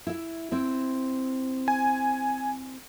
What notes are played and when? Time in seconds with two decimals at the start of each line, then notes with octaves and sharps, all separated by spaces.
0.07 E4 E5
0.52 C4 E4
1.68 G#5